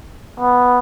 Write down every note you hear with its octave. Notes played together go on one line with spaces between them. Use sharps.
B3